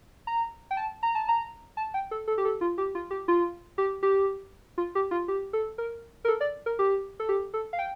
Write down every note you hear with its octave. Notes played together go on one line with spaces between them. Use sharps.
A#5
G5
A5
A#5
A5
A#5
A5
G5
A4
A4
G4
A4
F4
G4
F4
G4
F4
G4
G4
F4
G4
F4
G4
A4
A#4
A#4
A4
D5
A#4
G4
A4
G4
A4
F5
G5